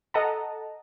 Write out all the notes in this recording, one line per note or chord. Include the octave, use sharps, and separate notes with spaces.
A4 D#5 F#5 A5 A#5